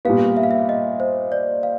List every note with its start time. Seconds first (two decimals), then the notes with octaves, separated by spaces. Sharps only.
0.05 A#2 G3 B3 F5
0.37 E5
0.43 F5
0.51 E5
0.69 D#5
1.00 C5
1.32 D5
1.63 F5